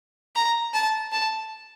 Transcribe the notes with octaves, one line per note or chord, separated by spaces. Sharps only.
A#5
A5
A5